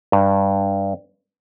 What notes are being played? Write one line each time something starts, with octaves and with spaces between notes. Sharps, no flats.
G2